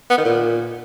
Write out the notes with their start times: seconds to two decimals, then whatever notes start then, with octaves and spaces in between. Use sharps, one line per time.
0.10 B3
0.18 D#3
0.25 A#2